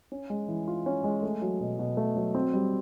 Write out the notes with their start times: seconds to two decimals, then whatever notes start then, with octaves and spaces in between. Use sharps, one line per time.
0.12 C#4
0.30 G#3
0.48 E3
0.68 F4
0.86 C#4
1.04 G#3
1.23 A3
1.42 F#3
1.60 B2
1.79 B2
1.97 A3
2.16 F#3
2.35 C4
2.54 G3